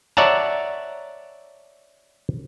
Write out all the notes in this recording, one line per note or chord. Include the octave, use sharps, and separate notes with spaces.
C#5 D5 E5 F#5 A5 A#5